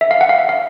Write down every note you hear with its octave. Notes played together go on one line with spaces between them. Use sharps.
E5
F5
F#5
F5
E5
F5